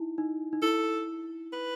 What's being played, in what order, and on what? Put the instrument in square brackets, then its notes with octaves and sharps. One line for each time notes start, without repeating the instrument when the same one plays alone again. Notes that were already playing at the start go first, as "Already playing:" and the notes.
Already playing: [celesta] D#4 E4
D#4
D#4
[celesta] E4 [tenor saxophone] A4
[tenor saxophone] B4